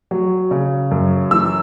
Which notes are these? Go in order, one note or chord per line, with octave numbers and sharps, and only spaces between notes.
F#3
C#3
F#2
E3 E6